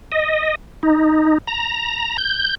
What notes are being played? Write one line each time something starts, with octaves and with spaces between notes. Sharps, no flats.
D#5
D#4
A#5
G6